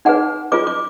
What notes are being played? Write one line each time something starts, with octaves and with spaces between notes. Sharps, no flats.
D#4 G#4 B4 F#5
F4 G#4 B4 D6
D6